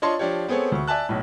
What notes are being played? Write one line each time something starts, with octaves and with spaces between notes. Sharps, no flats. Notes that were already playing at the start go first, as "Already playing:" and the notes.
D4 F4 C#5 D#5 A5 C6
F3 D4 F4 G4 C#5
B3 C4 G#4 A4 C#5
D2 C#6
D5 E5 G#5 A5 F#6
B1 A2